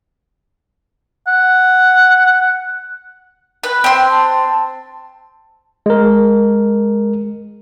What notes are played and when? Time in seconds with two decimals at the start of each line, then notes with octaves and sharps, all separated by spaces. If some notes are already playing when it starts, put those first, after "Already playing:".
1.27 F#5
3.63 B4
3.84 C4 C6
4.10 A5
5.86 G#3 A#4